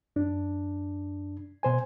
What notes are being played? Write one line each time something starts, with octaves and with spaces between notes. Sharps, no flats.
F#2 D4
B2 C5 G#5